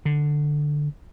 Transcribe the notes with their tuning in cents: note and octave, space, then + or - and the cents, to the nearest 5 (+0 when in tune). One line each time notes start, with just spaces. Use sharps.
D3 +10